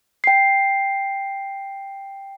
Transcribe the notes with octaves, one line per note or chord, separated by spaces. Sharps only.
G5 C7